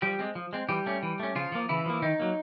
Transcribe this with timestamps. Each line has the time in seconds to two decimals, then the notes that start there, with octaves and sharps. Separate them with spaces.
0.02 F3 G3 G4
0.19 G#3 C4
0.35 F3
0.53 G#3 C4
0.69 E3 G3 G4
0.86 A3 C#4
1.03 E3
1.20 A3 C#4
1.35 C#3 F3 F4
1.52 F3 A#3
1.69 C#3 E3 E4
1.86 F3 A#3
2.02 D#3 D#4
2.20 F#3 A#3